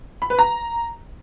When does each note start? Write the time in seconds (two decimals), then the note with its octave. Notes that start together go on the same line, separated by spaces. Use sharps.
0.22 B5
0.30 B4
0.39 A#5